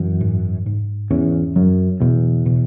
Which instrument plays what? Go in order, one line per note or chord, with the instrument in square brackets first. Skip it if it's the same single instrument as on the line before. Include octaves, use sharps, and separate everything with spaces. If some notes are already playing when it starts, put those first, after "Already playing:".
Already playing: [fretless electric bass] F#2 [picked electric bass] E3
[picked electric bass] G#2
G#2
[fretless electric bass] E2 [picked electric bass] C#4
[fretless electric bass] F#2 [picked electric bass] F#3
[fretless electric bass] E2 [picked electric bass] B2
[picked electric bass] B2